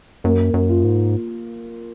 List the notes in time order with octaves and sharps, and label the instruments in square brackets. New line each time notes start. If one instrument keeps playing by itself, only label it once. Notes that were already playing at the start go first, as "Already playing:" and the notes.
[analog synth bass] F#2 [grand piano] A#3
[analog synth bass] F#2
[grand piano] F4
[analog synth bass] G#2